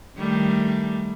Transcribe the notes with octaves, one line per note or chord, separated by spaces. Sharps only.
D#3 G3 A3